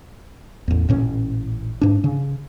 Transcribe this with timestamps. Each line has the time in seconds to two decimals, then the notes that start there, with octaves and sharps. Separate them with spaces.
0.68 A1 E2
0.89 A1 A#2 C#4
1.81 G#2 D4
2.04 C#3